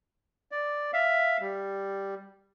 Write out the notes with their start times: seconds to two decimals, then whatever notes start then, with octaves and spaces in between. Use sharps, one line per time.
0.51 D5
0.93 E5 F5
1.41 G3